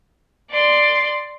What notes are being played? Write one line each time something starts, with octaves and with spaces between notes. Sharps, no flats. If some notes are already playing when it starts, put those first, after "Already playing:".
D5 C6